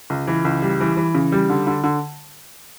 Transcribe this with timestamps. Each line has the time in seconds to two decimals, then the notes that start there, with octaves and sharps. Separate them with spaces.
0.10 C#2
0.27 E3
0.45 C#2
0.62 G3
0.80 E3
0.97 E3
1.15 C#3
1.32 G3
1.50 D3
1.67 D3
1.84 D3